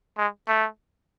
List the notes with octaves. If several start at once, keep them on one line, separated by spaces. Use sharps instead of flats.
G#3
A3